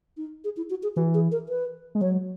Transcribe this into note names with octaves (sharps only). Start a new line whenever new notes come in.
D#4
G#4
E4
F#4
G#4
E3 F#4
G#4
A#4
B4
G#3
F#3 C#5